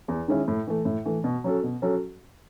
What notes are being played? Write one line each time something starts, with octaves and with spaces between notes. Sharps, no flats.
E2
D#3 G#3 C#4 E4
A2
E3 A3
A2
E3 A3
B2
F#3 C#4 F#4 A4
B2
F#3 C#4 F#4 A4